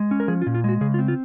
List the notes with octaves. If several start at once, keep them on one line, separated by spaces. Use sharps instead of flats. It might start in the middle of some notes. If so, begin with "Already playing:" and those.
Already playing: G#3
C#4
A#4
F3 G#4
F4
A#2
F4
G#3 F#4
C#3 G#4
F4
C4
F4